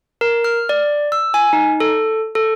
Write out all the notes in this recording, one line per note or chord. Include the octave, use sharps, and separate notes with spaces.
A#4
F6
D5
E6
G#5
D#4
A4
A4